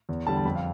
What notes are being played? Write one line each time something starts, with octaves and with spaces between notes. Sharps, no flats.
E2
D3 G3 A5
A5
F2 B5
F5